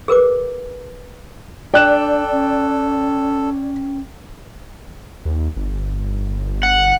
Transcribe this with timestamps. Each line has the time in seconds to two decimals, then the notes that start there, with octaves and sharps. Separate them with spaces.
0.08 G#4 A#4 B4 D6
1.74 D4 A4 D5 G5 F#6 E7
2.32 C#4
5.25 D#2
5.57 G1
6.63 F#5